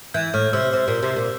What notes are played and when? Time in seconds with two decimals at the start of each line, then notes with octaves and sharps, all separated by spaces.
0.14 E3 G6
0.34 A2 F6
0.53 C3 E6
0.73 C3
0.88 A#2
1.03 C3
1.17 A#2